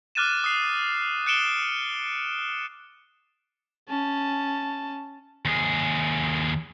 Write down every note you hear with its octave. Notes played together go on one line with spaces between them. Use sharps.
D6 F6 F#6 A6 D#7 E7
D#6 C7
F#6 C#7 D7 E7 G7
C#4 A5
D#2 G#4